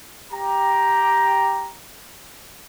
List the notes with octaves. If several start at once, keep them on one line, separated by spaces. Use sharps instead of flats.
G4 A#5